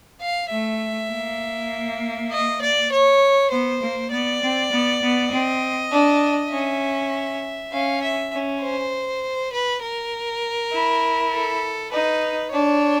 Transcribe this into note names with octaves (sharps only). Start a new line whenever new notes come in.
F5
A3 E5
A#3
D#5
D5
C#5
B3 C5
A#3
B3 D5
C4
B3
B3
C4 D#5
D4
C#4 E5
C#4 F5
E5
C#4
C5
B4
A#4
E4
A4
D#4 B4
D4 C#5